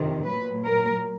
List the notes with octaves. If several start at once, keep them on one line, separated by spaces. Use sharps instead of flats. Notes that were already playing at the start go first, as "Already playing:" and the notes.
Already playing: F2 C3 D#3
A#2 F#3 B4
A#4